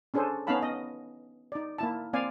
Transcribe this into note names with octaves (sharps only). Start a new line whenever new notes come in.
C#4 D4 G#4 A4 C5
B3 C#4 D#4 F5 A5 B5
D#5
D#4 D5
A#3 E4 A5
A#3 C4 D5 F5 G#5